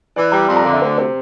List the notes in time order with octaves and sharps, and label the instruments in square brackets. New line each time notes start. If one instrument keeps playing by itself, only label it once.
[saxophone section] E3 [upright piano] D5
[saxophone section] G3 [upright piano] A#5
[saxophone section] F2 [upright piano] C6
[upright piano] A#5
[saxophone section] D3 [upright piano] F5
[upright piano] E5
[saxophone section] D2 [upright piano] C5
[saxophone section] C3 [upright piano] C5